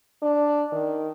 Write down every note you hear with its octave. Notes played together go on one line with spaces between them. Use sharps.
D4
D#3